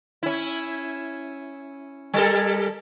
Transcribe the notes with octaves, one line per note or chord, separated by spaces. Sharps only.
C#4 E4
G3 A4 A#4